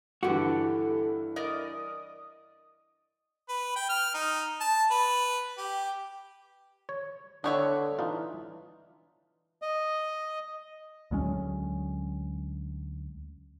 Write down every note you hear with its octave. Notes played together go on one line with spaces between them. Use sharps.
G2 D3 E3 F#4 G4 A4
A#4 D5 D#5 D#6
B4
G5
F6
D#4
A5
B4
G4
C#5
D3 B3 D4 C#5 E5 G5
E3 D4 D#4 F4
D#5
D2 F#3 G#3 C#4